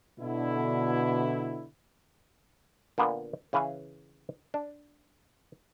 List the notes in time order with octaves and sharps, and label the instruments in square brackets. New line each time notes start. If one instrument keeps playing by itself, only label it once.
[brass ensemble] B2 D3 E4
[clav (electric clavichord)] A#2 D3 A#3 B3
C#3 E3 B4 F5 G#5
D4